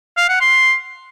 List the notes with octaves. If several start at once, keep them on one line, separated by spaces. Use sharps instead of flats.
F5
F#5
C6